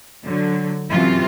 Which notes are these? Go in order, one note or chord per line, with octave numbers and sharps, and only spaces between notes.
D3 F#3
F#2 C3 E3 F4